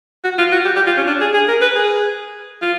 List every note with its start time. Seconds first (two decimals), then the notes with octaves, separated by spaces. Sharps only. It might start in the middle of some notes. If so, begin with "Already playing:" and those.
0.24 F#4
0.38 F4
0.52 F#4
0.65 G4
0.76 G4
0.87 F4
0.97 C#4
1.07 D4
1.21 G#4
1.34 G#4
1.48 A#4
1.62 B4
1.76 G#4
2.62 F4